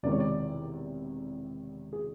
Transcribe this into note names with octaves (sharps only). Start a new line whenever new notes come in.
E1 E2 C3 D#3 D5
C#5
D5
G#4